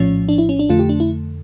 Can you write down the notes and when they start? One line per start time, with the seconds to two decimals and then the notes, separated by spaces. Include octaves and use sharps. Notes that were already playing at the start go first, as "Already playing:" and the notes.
Already playing: A#1 A2 F3 C#4
0.29 D4
0.38 E4
0.49 C#4
0.59 D4
0.69 F2 D3 A3 F4
0.79 G4
0.89 D4
1.00 E4